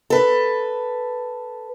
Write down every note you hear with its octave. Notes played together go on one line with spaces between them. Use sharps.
A4 B4